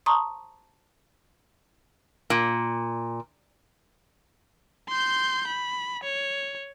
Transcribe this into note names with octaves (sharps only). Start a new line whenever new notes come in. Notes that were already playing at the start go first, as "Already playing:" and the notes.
A5 A#5 C6 C#6 D#6
A#2
C6 G6
B5
C#5